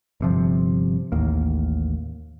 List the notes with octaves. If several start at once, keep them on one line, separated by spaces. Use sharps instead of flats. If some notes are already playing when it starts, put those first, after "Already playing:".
G1 C3 F3
A1 D#2 A#3